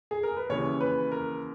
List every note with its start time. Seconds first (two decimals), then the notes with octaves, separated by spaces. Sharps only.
0.11 G#4
0.23 A#4
0.37 B4
0.49 D#2 C#3 E3 C#5
0.81 B4
1.11 A#4